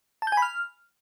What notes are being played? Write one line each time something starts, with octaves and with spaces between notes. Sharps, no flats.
A5
G6
G#5
B5
F6